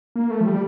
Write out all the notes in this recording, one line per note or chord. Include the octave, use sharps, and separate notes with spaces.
A#3
A3
F3
G3